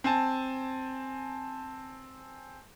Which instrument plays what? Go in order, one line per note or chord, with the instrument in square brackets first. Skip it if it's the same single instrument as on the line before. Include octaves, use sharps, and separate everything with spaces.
[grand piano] C4 G#5 A5